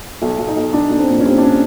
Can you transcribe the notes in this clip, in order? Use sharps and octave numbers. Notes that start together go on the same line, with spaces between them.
B1
B1
D#4
B1
B1 D4
B1
C4
A#2
C#4
G3 C4
D4
C#4